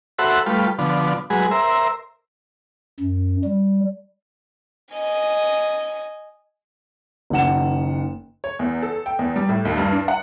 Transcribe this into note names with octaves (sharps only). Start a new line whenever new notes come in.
F#4 A4 C5 E5 F#5 B5
G3 A3 F4 B4
D3 F3 B3
F#3 G#3 G#4 B4
A#4 C5 E5
F#2
G3
D#5 G#5
F#1 D#3 F#5 E7
C#5
E2
A4
G5
E2
G3
A2
D#2
G2
D4
F#5